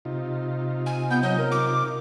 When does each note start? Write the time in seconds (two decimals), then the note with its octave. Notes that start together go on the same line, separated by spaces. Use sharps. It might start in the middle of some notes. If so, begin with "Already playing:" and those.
0.05 C3 D#4 F4
0.86 G#5
1.10 B3 G6
1.23 F#3 D#5
1.38 A#4
1.52 D6